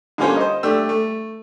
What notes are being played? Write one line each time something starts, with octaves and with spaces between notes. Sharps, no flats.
D3 G3 A#3 C#4 F4 C5
C5 D#5
A3 D4 G4 E6
A3